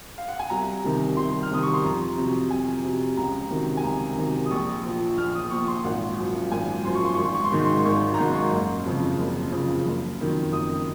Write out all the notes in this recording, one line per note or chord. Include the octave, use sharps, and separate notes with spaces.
F5
F#5
G#5
C2 A#5
C3 D#3
C2 C6
F6
C3 D#3 D#6
C#6
C6
F2 A#5
C3 F#3
F2 G#5
C3 F#3
C#2 A#5
C3 D#3 F#3
G#5
C#2 A#5
C3 D#3 F#3
D#6
A#1 C#6
A#2 F3
A#1 F6
D#6
A#2 F3 C#6
C6
G#1 F#5
F#2 F3
G#1 G#5
F#2 F3 C6
C#6
C6
G#1 C#6
C6
C#6
C6
G#2 D#3 F#3 C#6
C6
C6
G#1 C#6
A#5
G#2 D#3 F#3 C6
C6
C#6
F#1
F2 C#3 F3
F#1
F2 C#3 F3
F#1
F2 D#3 F#3
F#1 D#6